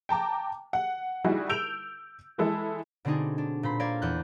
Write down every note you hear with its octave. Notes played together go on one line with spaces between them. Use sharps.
G5 A5 A#5 D6
F#5
G3 D#4 E4 F#4 G#4
E6 G6 D7 F7
E3 G#3 E4 A4
B2 D3 C4 D4 D#4 G#4
D4
A#2 C5 B5
A#4 C5 D5 F5 G#6
E2 F#6 G6